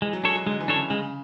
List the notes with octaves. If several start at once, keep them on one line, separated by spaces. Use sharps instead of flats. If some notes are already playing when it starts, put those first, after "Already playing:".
E3 G#3
F#3
G#3 D4 A4 C#5
F#3
D3 G#3
E3
D4 A4 C#5
C#3
C#3 G#3